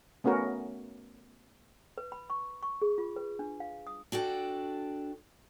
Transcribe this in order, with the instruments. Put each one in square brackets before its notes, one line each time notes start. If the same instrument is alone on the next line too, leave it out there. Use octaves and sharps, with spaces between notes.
[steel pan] A3 B3 C#4 F#4 A#4
[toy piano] B4
B5
C#6
C#6
G#4
F4
B4
D4
F5
D#6
[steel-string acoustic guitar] D4 F#4 A4 G5